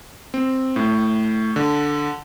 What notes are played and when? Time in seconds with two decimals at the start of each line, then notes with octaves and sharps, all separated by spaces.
0.34 C4
0.76 A2
1.56 D3